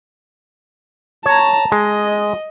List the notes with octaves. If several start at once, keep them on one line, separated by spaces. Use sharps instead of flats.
C#5 A5 A#5
G#3 D#5